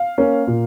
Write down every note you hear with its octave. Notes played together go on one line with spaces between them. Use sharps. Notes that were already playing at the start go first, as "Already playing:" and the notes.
Already playing: F5
A#3 C#4
A#2